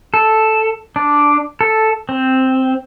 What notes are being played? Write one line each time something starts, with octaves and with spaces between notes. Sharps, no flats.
A4
D4
A4
C4